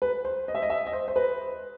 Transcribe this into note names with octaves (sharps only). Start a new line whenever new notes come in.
B4
C5
D#5
E5
D#5
E5
D#5
C5
C5
B4